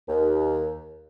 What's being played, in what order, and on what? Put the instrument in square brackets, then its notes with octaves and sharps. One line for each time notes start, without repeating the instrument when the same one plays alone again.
[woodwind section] D#2